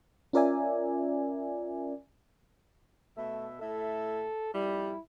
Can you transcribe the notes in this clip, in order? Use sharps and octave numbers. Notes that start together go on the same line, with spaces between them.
C#4 F4 A#4 D5 E5 G#5
B2 A3 E5
A2 A4 E5
F2 G3 E4